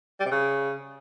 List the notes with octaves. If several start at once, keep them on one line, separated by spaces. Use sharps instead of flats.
G3
C3
C#3